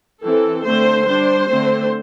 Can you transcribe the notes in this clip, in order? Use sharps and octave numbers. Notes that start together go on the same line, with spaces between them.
E3 C4 A4
D3 A3 C4 C5
G3 D4 C5
D3 A3 C4